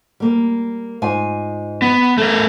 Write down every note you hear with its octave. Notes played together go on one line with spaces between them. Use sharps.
G3 A#3
G#2 F4 G#5
B3
A3 A#4